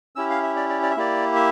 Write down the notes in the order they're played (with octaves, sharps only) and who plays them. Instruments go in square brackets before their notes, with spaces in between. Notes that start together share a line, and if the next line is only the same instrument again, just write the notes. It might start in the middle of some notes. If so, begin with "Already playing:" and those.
[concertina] C#4 E4 G4 E6
F5
E5
D5
D5
D5
E5
A#3 E4 G4 D5
E5